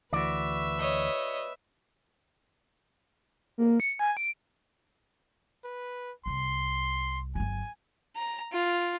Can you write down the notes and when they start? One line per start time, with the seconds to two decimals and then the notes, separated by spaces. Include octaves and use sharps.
0.13 D2 E3 F#4 B4 D5 E5
0.78 C#5 D#5
3.58 A#3
3.80 C#7
3.99 G#5
4.17 D7
5.65 B4
6.26 C2 G3 C6
7.35 G1 F#3 G#5
8.16 A#5
8.52 F4